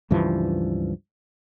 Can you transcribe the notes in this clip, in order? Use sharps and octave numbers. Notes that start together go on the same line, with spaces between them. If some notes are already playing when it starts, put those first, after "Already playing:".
C#2 G2 E3 F3